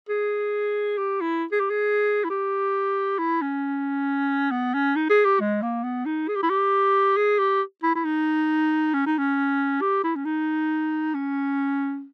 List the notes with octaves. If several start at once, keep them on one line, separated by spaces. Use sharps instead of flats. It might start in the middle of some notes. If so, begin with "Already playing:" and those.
G#4
G4
E4
G#4
G4
G#4
E4
G4
E4
C#4
B3
C#4
D#4
G#4
G4
G#3
A#3
B3
D#4
G#4
G4
E4
G4
G#4
G4
E4
E4
D#4
C#4
D#4
C#4
G4
E4
C#4
D#4
C#4